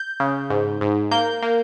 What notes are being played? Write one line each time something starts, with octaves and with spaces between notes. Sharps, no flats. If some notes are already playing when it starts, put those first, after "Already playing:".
Already playing: G6
C#3
G#2
G#2
A#3 G6
A#3